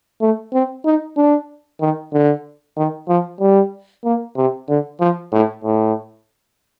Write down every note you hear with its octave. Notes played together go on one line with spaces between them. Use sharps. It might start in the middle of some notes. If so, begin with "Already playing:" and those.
A3
C4
D#4
D4
D#3
D3
D#3
F3
G3
A#3
C3
D3
F3
A2
A2